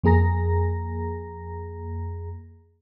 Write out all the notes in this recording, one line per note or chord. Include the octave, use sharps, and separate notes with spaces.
F2 A#3 G#4 A#5 A#6